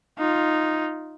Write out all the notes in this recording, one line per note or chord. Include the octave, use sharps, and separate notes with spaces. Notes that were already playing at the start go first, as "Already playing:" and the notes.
D#4 F4